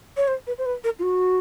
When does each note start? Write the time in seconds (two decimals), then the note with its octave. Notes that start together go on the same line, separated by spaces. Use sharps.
0.17 C#5
0.28 C5
0.47 B4
0.58 C5
0.66 B4
0.84 A#4
0.99 F4
1.03 F#4